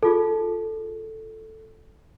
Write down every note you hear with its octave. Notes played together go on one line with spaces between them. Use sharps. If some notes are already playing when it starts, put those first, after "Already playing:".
D#4 F4 G#4 A4